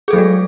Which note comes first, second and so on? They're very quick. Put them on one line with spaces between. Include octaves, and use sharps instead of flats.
G#4 A4 F#3 A3 G#3